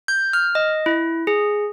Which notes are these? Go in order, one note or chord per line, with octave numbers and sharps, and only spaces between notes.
G6
F6
D#5
E4
G#4